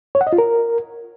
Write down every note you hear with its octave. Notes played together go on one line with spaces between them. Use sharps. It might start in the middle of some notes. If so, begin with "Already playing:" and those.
C#5
F#5
D#5
F4
A#4